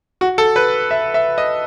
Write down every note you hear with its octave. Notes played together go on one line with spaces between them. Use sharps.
F#4
A4
B4
E5
E5
D#5